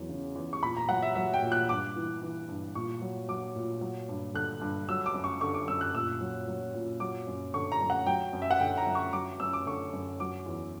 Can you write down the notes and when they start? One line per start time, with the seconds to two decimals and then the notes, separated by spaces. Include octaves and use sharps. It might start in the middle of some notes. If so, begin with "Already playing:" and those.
Already playing: E2 F#3
0.09 C#3
0.36 E2
0.53 C#6
0.63 A#2 B5
0.77 A#5
0.89 F#3 F#5
1.02 E5
1.15 F#3 E5
1.34 G5
1.43 A#2
1.52 F#6
1.69 G2 D6
1.96 E3
2.22 E3
2.49 G2
2.75 A#2 C#6
3.01 F#3
3.29 F#3 D6
3.56 A#2
3.81 F#3
4.09 G2
4.34 D3 F#6
4.61 G2
4.88 F#3 E6
5.06 D6
5.14 F#2
5.24 C#6
5.41 D3 C#6
5.54 D6
5.68 F#2 E6
5.81 F#6
5.94 A#2 E6
6.21 F#3
6.48 F#3
6.74 A#2
7.00 F#3 D6
7.27 F#2
7.54 D3 C#6
7.72 A#5
7.81 F#2
7.90 F#5
8.06 F#3 G5
8.33 F#2
8.42 E5
8.51 F#5
8.60 D3 G5
8.77 A#5
8.87 F#2
8.95 C#6
9.13 F#3 D6
9.40 F#2 E6
9.53 D6
9.66 D3 C#6
9.93 F#2
10.20 F#3 D6
10.46 E2